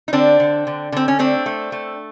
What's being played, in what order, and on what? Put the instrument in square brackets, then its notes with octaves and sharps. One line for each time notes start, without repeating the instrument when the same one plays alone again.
[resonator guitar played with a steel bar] D#4
D3 C4 D4
D3
D3
D3 C4
C#4
A3 C4 D4
A3
A3